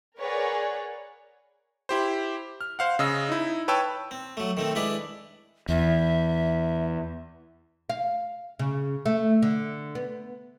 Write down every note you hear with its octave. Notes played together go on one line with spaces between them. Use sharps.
G#4 A#4 B4 C#5 D5 F#5
E4 G4 C5
F6
C5 F5 F#5
C#3 D#5 E6
D#4 E4
B4 C#5 G5 A5 E6
C4
F#3 A3
D#3 A3 C4
G#3 D4 E4 B4 D5
E2 E5
F5
C#3
A3
D3
B3